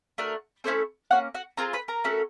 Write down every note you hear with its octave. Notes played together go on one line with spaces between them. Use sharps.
A3 D4 F#4 A#4
A3 C4 C#4 E4 A4 C5
A#3 C#4 F#4 F#5
F#4 F#5
C4 F4 G#4 A#4 A#5
B4 B5
A#4 A#5
A3 C#4 F#4 A4